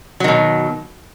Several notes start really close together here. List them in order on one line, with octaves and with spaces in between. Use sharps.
F#3 D#3 B2